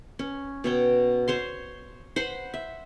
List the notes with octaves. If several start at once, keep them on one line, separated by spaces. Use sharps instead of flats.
C#4
B2 C#5 G5
C5 C#5 C6
C5 F#5 B5 C6
E5